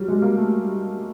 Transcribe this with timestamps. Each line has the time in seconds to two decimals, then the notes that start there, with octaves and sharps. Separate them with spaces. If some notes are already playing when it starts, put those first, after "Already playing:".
Already playing: F#3 G3
0.08 G#3
0.22 A#3
0.37 A3